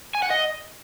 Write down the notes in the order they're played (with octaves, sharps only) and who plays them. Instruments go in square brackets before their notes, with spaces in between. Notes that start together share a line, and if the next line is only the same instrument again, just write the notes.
[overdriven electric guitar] G#5
F#5
D#5